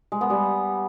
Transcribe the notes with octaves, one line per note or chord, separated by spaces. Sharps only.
G#3
B3
G3